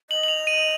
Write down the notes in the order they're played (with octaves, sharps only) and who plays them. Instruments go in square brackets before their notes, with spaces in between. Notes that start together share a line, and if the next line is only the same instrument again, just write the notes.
[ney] D#5 [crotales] F#7
[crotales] F#7
F7
D#7